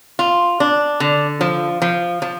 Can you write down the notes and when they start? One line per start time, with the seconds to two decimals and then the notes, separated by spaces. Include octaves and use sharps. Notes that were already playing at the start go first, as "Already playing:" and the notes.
0.19 F4
0.60 D4
1.00 D3
1.41 F3
1.82 F3
2.22 F3